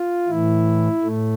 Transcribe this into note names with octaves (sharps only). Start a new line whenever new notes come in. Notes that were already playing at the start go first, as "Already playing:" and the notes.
Already playing: F4
A2 E3 E4
A2 A3